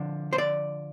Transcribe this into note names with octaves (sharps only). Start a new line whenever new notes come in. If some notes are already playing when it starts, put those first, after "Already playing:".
Already playing: D3 F3 D4
C5
D5